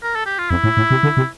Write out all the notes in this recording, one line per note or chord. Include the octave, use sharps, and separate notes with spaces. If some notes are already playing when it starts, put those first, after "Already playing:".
A#4
A4
G4
F4
F2 E4
A2
A2
C3
D3
C3